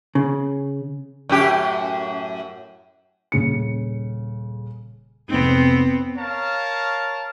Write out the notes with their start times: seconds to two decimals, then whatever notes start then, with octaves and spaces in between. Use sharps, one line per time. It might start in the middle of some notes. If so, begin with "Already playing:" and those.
0.15 C#3
1.29 F#2 A2 G4
3.32 D#1 C#3 C#7
5.29 F1 G#2 B3 C4
6.17 A#4 C#5 F5 A5